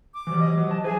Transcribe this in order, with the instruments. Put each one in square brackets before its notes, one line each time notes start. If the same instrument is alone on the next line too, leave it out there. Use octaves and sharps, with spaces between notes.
[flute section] D6
[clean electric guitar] E3 F#3 G3
[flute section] D#5
[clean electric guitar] F#3
A5
[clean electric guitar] E4 B4 C5 [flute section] G#4 G#5